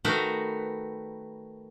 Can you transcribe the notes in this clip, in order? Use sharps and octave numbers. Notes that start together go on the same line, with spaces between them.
D#3 A3 D#4 F#4 A#4 B4